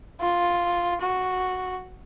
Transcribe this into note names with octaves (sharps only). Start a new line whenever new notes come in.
F4
F#4